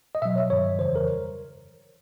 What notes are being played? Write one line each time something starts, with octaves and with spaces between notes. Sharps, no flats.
D#5
B2 F#3 E5
C#5
G2 D#3 F#3 C#5
F2 C#3 E3 G3 C5
A#4